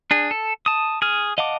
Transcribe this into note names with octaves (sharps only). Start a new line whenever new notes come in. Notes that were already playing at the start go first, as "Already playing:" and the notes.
D4 G#4
A4
A5 D#6
G#4 F6
D#5 F5 F#5 A5 D6